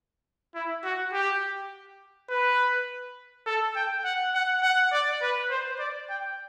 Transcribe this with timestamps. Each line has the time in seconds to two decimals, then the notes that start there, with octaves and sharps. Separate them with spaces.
0.55 E4
0.84 F#4
1.13 G4
2.30 B4
3.46 A4
3.76 G5
4.05 F#5
4.34 F#5
4.63 F#5
4.92 D5
5.22 B4
5.50 C5
5.79 D5
6.10 G5